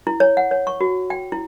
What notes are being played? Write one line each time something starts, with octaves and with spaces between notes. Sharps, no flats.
E4
C#5
F#5
C#5
C#6
F#4
G5
E4